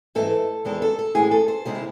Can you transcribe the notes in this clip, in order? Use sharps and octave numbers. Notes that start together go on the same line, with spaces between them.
G#2 E3 A3 C4 A4
E2 D#3 G#3 C4 A4
A4
A4
A2 E3 G#3 C4 G#4
A4
C5
C3 D#3 G#3 C4 G#4
E4